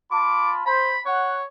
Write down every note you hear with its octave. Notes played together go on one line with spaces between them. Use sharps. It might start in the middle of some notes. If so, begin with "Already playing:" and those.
F4 A5 B5 D6
C5 B5
C#5 F#5